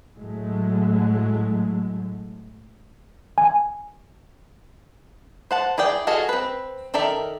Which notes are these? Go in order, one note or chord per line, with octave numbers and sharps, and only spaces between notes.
A2 F#3 G#3 A3
G#5
C5 F#5 A5
E4 G#4 D5 G5
F4 F#4 G#4 A4 D#5
C4 B4
D#3 A4 A#4 D5 E5